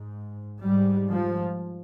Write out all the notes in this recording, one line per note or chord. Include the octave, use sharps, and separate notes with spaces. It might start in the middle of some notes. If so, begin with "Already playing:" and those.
Already playing: G#2
G#2 G3
F3